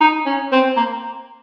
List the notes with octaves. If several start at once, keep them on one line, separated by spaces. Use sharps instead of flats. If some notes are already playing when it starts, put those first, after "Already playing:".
D#4
C#4
C4
A#3